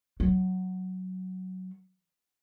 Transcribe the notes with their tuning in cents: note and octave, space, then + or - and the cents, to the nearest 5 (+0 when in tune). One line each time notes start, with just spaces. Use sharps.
F#3 +5